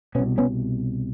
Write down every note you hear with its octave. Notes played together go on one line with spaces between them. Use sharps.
C2 B2 B3 C#4
B3 C#4